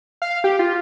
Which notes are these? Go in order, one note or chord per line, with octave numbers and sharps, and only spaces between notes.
F5
G4
F4